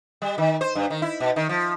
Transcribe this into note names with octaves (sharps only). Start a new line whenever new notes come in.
G3
D#3
C5
G2
D#3
E4
B2
D#3
F3